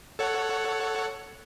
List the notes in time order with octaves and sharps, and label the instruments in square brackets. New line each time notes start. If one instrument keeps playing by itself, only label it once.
[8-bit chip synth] A4 C#5 F#5